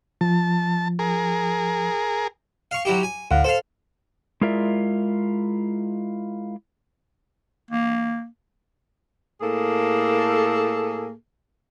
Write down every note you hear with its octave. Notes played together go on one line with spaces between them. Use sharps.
F3 A5
G#4 A#4
F5 C#6
F#3 E4 G4
G#5
D2 A2 F5 F#5
A4 C5 F5
G#3 E4 F4 A#4 D5 E5
A#3
A2 A#3 G#4 A4